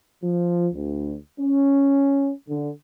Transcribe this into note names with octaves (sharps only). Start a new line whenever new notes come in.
F3
D2
C#4
D3